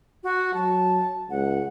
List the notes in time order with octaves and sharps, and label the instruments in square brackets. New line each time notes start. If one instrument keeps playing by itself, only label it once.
[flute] F#4
[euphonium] F#3 [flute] A5
[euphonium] C#2 [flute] F#5